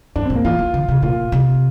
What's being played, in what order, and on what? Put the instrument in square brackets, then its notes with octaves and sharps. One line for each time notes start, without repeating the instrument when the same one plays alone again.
[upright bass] G2 [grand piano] D4
[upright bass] A2 [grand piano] C4
[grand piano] A#3
[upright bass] E3 [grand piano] F4
[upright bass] E3
D3
C3
[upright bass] A#2 [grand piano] F4
[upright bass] C3